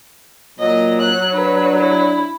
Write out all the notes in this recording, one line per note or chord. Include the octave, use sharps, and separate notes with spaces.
A#2 F#3 D#5
F#6
D4 B4
E4